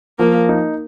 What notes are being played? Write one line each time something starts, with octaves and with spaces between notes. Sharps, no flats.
F3 A#3
D#4